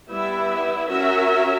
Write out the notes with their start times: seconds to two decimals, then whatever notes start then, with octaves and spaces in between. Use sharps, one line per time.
0.09 G3 B3 E4 B4 E5
0.90 C#4 F#4 A#4 E5